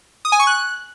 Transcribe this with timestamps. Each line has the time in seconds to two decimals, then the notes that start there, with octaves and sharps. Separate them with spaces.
0.25 D#6
0.32 G#5
0.40 C#6
0.47 F#6